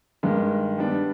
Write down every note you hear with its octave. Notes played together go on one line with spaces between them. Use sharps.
G2 D#3 G#3
G3 B3 D4